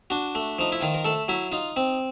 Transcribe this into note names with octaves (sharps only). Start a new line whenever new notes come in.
D4 F#4
A3
F3 D#4
E4
D#3 F4
A#4
A3 A4
F#3 E4
D#4 F4
C4